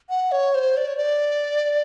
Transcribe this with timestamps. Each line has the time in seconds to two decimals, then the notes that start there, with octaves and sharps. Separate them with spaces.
0.09 F#5
0.32 C#5
0.55 C5
0.77 D5
0.88 C#5
0.97 D5